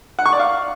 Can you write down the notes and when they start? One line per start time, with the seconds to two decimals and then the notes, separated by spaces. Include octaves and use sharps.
0.19 F#5
0.26 C#6
0.33 D5
0.40 F5